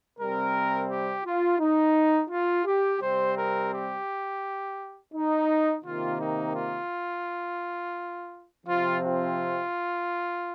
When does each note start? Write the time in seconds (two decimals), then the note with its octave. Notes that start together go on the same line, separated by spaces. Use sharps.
0.18 C3 G3 C4 A#4
0.88 G4
1.25 F4
1.59 D#4
2.30 F4
2.66 G4
3.01 C3 G3 C4 C5
3.36 A#4
3.71 G4
5.13 D#4
5.83 C3 D#3 A#3 F4
6.19 D#4
6.54 F4
8.66 C3 F3 C4 F4
9.02 F4